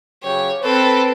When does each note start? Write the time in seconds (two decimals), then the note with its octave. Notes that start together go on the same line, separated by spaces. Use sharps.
0.23 C#3 F#3 G4 C#5
0.63 C4 A4 B4